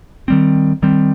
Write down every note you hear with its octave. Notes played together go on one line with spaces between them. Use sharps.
D#3 G3 C4
D#3 G3 C4